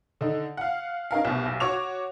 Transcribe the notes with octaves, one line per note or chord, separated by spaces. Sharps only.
D3 D#4
F5 F#5
C#4 D#4 A#4 F5
C2 B2
B1
F#4 C#5 D6 F7